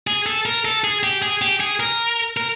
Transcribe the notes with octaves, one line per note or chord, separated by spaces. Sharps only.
G#4
A4
A#4
A4
G#4
G4
G#4
G4
G#4
A#4
A#4